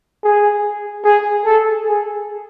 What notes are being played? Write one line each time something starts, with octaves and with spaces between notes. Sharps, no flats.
G#4
G#4
A4
G#4